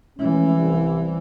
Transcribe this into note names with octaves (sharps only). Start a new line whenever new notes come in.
E3 G#3 A3 C#4
C2